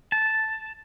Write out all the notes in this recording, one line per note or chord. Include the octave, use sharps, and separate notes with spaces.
A5